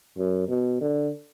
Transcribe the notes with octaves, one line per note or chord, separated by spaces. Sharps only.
F#2
B2
D3